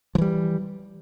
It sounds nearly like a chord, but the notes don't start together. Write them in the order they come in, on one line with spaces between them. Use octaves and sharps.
F3 E3 G3